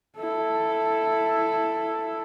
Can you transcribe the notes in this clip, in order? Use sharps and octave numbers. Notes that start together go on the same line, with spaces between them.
E4 A4